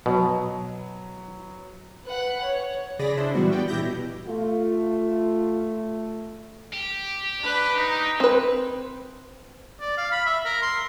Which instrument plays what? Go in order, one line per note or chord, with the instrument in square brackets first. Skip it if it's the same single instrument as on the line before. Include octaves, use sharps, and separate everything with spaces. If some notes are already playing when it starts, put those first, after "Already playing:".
[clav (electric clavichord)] B2 [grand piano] F#3 B3
[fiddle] B4 F#5
C#5
[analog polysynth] C#3 G#4 D5 B5 A#6
D4 E4 C5
A#2 E3 G3 B3 F#4
B3 D5 G5
A#1 E3 E4 G4 G6 A#6
B2
[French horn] A3 [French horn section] F4
[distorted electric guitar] G4
[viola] D4 B4
D#4
[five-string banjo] C4 B4
[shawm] D5
F5
B5
E5
A#4
C6